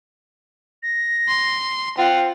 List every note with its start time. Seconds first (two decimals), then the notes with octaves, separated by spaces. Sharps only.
0.83 A#6
1.28 C6
1.98 C4 F4 F#5